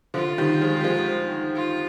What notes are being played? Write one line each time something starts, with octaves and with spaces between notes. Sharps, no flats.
D3 F3 F4
D#3 G3
F3 G#3
G3
F3 G#3
F4